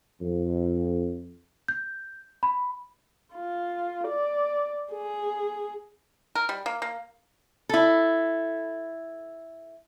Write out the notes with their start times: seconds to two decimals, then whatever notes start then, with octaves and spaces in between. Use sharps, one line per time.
0.21 F2
1.68 G6
2.43 B5
3.35 F4
4.08 D5
4.92 G#4
6.35 A#4
6.49 G3
6.66 A#3
6.82 A#3
7.69 E4 A4